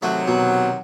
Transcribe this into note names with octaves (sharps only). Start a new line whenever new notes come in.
C3 D#3 F#3 A3
B2